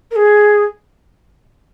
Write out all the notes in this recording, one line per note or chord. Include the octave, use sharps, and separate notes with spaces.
A#4
G#4